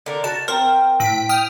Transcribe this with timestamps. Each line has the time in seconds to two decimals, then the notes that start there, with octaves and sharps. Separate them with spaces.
0.06 D3 A#4
0.24 F#4 A5
0.48 C4 A#4 G5
1.00 A2 B6 D7
1.29 G5 D#6 F6